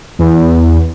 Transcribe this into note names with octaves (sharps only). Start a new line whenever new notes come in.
E2